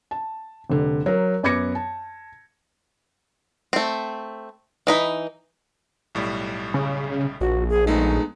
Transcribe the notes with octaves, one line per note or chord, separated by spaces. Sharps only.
A5
F1 D3
F#3 A#4
F#2 B3 D6 G#6 A#6 C#7
A5
A3 C4
E3 D#4 B5
B1 A2 G3
C#3
A#1 F#4
G#4
G#3 A3 B3 D#4